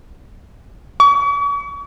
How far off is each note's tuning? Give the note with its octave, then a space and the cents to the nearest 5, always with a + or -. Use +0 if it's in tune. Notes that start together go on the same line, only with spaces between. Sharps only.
C#6 +35